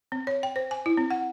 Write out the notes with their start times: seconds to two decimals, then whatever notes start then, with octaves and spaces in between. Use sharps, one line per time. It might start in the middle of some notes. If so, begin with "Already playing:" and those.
0.12 C4
0.27 C#5
0.43 G5
0.56 C5
0.71 G#5
0.86 E4
0.97 C4
1.11 F#5